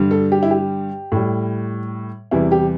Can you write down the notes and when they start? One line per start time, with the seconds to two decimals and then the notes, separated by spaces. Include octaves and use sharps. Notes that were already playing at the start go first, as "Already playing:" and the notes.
Already playing: G2 D3 G3
0.11 A4
0.32 G4
0.43 E4
0.51 G4
1.12 A2 G3
2.31 E2 C3 E3 G3 E4
2.52 G4